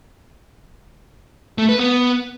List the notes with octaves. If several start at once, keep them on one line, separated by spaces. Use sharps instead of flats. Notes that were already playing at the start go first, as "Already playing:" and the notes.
A3
B4
B3